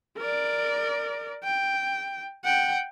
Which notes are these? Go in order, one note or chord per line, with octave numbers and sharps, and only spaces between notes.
A#4 D5
G5
F#5 G5